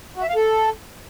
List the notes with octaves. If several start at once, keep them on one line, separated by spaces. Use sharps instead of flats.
F#4
E5
F5
A4